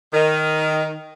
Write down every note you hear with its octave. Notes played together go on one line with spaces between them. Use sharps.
D#3